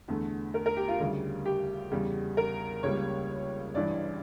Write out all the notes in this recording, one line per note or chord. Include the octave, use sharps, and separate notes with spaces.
E2 D3 A3
A#4
A#4
G4
F4
D2 C#3 G3
G4
E2 C#3 G3
A#4
C#2 C#3 G3 A#3 C#5
A1 G2 E3 D5